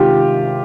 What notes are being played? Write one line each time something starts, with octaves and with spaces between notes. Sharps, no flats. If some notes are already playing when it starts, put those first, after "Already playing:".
Already playing: C3 D#3 G#3 D4 F4 G4